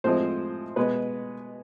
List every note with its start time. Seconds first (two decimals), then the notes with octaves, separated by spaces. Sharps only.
0.04 A2 F3 G#3 C4 C5
0.76 B2 G#3 B3 B4